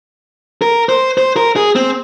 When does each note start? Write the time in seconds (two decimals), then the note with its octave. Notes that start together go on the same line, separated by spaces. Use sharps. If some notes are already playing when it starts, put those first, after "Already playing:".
0.62 A#4
0.89 C5
1.18 C5
1.36 A#4
1.56 G#4
1.75 C4